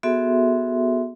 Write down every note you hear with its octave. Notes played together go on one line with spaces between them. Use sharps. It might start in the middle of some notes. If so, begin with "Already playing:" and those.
B3 F#4 G#4 A4 E5 C6